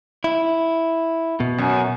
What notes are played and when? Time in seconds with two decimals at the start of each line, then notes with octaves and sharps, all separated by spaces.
0.24 E4
1.40 B2
1.58 F#2